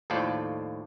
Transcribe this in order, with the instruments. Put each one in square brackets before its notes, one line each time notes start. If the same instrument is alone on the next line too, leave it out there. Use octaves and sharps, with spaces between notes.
[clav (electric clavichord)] D#2 A2 F3 F4 A4 D5